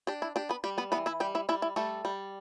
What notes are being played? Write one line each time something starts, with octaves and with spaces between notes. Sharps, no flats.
D4 G4
E4
D4 G4
B3 B4
G3 G4
B3 B4
E3 B3 B4
E4 E5
G3 G4 G5
E4 E5
G3 E4 E5
E4
G3 A3 A4
G3